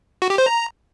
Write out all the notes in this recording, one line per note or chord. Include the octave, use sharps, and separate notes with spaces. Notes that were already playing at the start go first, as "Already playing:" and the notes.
F#4
G4
C5
A#5